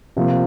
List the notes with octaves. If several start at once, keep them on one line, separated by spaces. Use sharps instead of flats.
C3 F3 A#3 F4